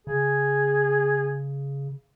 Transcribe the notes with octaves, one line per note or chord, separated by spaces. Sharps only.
C#3 G#4